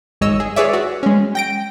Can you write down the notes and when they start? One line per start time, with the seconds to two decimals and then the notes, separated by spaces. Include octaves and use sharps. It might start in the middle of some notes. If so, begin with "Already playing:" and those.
0.21 G#1 G#2 C#5 D#5 E6
0.40 G#4
0.56 G#4 B4 C#5 D5 E5
0.73 F#4
1.03 G#3 C#4
1.35 G5 A#6 D7